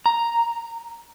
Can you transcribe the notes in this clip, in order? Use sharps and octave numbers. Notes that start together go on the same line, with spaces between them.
A#5